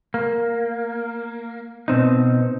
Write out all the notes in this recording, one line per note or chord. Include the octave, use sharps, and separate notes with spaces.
A#3
B2 C4 D#4